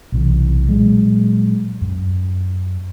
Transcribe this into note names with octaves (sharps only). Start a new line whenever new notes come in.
B1 C3 E3
A#2 F#3 G#3
F#2